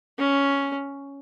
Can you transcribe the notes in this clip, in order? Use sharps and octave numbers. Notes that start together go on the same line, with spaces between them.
C#4